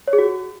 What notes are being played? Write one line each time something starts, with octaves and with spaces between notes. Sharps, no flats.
C#5
G#4
F#4